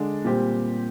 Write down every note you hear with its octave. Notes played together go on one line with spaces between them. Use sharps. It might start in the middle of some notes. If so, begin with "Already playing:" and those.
Already playing: D3 G#3 D4
A#2 G3 C4 G4